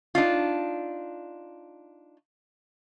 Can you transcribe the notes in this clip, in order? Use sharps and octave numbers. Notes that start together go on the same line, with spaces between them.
D4 D#4 F4